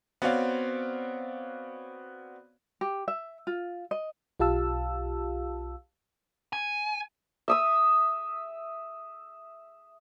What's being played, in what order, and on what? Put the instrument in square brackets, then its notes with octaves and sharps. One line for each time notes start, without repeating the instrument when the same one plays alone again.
[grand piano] B3 C4 F#4 C#5 D5 F5
[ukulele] G4
E5
F4
D#5
[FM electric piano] B1 F4 G4 F5 A5 E6
[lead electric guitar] G#5
[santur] E5 D#6 E6